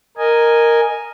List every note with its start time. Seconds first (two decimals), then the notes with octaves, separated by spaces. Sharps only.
0.17 A#4 D#5 G#5